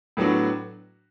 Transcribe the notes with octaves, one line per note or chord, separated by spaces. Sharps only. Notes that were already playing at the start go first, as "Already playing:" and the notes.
A2 F#3 B3 D4 F#4